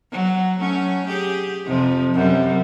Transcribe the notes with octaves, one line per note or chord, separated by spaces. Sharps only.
F#3
F#3 A3 C#4
G4 G#4
F2 C3 F3
F#2 C3 G3